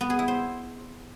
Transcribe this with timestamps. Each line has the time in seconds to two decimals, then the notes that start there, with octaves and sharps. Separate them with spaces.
0.01 B3
0.10 G#4
0.19 E4
0.28 C5